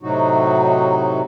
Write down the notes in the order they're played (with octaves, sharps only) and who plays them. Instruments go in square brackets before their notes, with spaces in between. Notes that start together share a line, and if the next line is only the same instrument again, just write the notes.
[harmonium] A2 C3 F#3 D#4 F#4